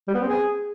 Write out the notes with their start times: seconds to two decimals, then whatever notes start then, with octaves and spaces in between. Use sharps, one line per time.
0.07 G3
0.14 B3
0.21 C4
0.28 G#4